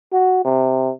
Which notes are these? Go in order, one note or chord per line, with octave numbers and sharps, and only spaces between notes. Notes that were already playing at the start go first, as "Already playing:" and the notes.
F#4
C3